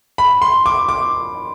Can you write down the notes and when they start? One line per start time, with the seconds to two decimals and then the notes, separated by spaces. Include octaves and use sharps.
0.18 B5
0.42 C6
0.66 D6
0.89 D6